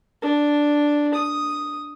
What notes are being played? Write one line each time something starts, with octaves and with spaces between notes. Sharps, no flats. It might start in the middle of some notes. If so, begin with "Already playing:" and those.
D4
D#6